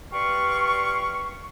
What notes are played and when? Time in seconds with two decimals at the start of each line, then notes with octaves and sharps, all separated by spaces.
0.13 G4 B4 D5 F5 C6 C#6